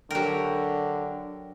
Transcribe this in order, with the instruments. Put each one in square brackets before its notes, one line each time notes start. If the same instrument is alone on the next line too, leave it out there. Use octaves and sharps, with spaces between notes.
[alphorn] D3 [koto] F#3 A#4 [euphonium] D4 [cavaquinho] G4 G5